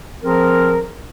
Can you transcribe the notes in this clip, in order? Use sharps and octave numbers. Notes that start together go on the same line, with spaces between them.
F3 C4 G#4 A#4